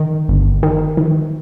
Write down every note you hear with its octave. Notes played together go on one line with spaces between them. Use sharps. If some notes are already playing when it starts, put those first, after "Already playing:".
Already playing: D#3
G1
D#3
D#3